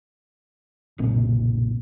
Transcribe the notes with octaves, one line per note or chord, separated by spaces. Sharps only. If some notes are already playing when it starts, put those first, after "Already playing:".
F#1 B1 A#2 C4